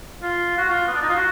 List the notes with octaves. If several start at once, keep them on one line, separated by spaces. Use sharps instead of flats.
F4
F#4
F4
B3
D4
D#4
F4
F#4